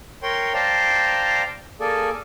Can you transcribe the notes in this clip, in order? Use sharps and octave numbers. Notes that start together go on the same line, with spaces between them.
A#4 C#5 G5 C6
C5 D5 F5 G5 A5 A#5
A#3 G#4 A4 D5